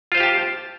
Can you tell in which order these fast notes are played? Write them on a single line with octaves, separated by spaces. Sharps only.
F4 C5 F5 G4 A5